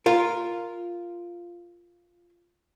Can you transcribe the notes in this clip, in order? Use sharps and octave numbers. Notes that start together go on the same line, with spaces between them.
F4 A#4